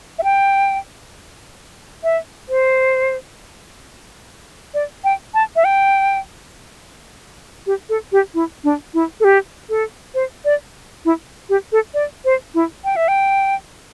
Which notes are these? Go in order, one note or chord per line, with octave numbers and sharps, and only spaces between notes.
E5
G5
E5
C5
D5
G5
A5
E5
G5
G4
A4
G4
E4
D4
E4
A4
G4
A4
C5
D5
E4
G4
A4
D5
C5
E4
G5
E5
G5